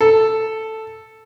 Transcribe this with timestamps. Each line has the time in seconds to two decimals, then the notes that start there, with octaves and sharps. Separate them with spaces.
0.01 A4